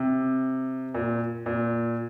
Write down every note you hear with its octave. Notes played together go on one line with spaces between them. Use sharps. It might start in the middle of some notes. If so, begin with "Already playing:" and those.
Already playing: C3
A#2
A#2